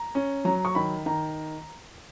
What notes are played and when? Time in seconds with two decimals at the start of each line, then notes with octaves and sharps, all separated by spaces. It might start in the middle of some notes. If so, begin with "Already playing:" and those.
Already playing: A#5
0.15 C#4
0.45 F#3 A#5
0.65 C#6
0.75 D#3 B5
1.06 D#3 A#5